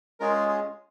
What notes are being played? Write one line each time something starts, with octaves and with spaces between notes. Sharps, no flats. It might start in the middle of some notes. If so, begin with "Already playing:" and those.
G#3 C#4 F4 G#4 A#4
G#4